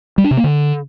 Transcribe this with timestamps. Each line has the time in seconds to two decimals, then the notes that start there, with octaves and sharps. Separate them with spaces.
0.18 G3
0.24 D4
0.31 C3
0.37 A#3
0.44 D3